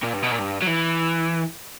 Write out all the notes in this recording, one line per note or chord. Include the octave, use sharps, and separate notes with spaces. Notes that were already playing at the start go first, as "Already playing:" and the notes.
A#2
G2
B2
A#2
G2
F#3
E3